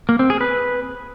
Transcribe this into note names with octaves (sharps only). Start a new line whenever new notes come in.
A#3
C4
G#4
B4